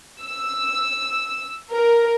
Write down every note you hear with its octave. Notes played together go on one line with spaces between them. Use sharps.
E6
A#4